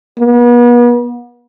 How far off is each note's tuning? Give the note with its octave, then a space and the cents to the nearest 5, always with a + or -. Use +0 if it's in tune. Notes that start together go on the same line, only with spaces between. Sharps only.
B3 -40